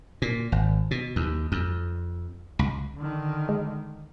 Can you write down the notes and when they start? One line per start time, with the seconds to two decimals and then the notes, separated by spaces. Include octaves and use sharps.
0.22 A#2
0.52 G#1
0.91 B2
1.16 D#2
1.52 F2
2.59 C#2
2.97 D3 D#3
3.49 G#3